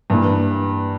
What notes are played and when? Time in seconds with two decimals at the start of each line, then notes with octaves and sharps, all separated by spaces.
0.10 G2 E3 A#3